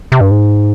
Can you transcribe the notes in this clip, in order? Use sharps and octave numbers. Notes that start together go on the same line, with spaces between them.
C3
G2
G#2